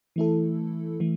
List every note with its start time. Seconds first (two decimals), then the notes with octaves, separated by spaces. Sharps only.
0.16 E3 A3 E4 A4
1.00 E3 A3